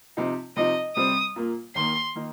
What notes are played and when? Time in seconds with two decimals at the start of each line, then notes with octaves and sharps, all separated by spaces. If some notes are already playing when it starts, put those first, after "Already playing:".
0.17 C3 F3 D#4
0.57 C3 F3 D#4 D#5
0.96 C3 G3 C4 D#6
1.36 A#2 A#3 F4
1.75 D#2 D#3 A#3 C6
2.16 D#3 A#3 D#4